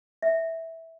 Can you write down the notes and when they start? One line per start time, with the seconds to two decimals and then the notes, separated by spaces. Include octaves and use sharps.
0.22 E5